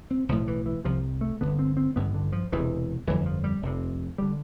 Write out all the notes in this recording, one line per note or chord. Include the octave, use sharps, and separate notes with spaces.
C4
B1 A2 F3
E3
E3
C2 C3 F3
A3
G1 G2 D3 B3
C4
C4
A1 G2 D3 B3
D3
F3
E1 E2 C3 E3
G1 F2 D3 E3
F3
G3
F1 F2 C3
D3 G3